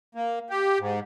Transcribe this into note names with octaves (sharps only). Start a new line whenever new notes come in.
A#3
G4
G#2